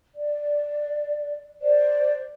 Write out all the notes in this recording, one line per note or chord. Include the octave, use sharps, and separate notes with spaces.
D5
C5 D5